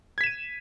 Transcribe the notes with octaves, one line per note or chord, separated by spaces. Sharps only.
G#6 B6 D#7 E7